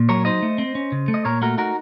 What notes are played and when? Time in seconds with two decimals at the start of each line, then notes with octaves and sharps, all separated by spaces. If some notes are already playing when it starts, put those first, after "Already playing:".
Already playing: A#2
0.09 F#3 A#4 C#5
0.25 D#4 C5 D#5
0.43 A3
0.58 C4
0.75 C#4
0.92 C#3
1.08 A3
1.14 D#5
1.25 A#2 A#4 C#5
1.42 A3 F#4 A#4
1.58 D#4 F#4 A#4